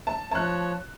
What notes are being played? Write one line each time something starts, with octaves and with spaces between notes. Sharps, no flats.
A5
F3 C#5 A5 F#6